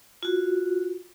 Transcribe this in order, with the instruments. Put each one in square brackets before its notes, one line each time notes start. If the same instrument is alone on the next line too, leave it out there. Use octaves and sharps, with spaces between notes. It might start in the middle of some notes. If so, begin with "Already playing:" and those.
[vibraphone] F4 F#4